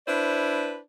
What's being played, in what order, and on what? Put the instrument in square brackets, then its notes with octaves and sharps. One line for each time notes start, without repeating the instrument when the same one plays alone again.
[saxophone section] D4 E4 B4 C5 D5